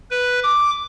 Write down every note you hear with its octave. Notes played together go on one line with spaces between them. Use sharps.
B4
D6